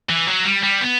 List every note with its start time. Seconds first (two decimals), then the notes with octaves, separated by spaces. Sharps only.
0.09 E3
0.27 F#3
0.45 G3
0.63 G3
0.81 B3